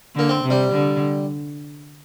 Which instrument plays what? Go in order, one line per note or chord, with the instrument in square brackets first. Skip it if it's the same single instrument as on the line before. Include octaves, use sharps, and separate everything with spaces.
[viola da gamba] D3 [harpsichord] A#3
[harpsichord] C4
[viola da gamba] C3
[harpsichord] G3
[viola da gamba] D3